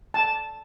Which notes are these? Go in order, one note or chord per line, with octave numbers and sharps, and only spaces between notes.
A5